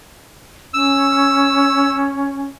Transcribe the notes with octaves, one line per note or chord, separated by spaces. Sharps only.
C#4 E6